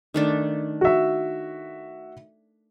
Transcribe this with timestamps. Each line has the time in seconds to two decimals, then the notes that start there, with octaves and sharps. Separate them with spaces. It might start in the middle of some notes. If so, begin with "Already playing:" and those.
0.14 D#3 A3 D4
0.81 F#4 E5